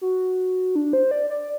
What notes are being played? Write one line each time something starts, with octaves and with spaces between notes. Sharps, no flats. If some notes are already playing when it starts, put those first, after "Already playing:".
F#4
D4
C5
D5
D5